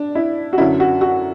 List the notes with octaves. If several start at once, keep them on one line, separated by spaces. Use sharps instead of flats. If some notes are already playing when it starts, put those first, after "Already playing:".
Already playing: D4
E4
F#4
F#2 D3 F#3 E4
F#4
F#4